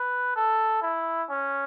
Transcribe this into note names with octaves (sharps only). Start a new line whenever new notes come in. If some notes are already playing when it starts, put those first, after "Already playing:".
Already playing: B4
A4
E4
C#4